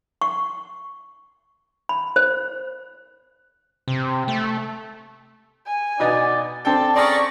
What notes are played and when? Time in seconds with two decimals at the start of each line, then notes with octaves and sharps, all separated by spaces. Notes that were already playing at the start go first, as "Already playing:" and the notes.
0.22 C#6
1.89 B5
2.16 C5
3.88 C3
4.28 A3
5.67 G#5
6.00 B2 B3 D#4 D5
6.65 C4 A4 D5 G5 A5
6.96 C#4 G#4 D5 A#5 C#6